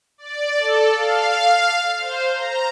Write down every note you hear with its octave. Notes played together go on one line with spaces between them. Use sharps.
D5
A4
F5
C5
A#5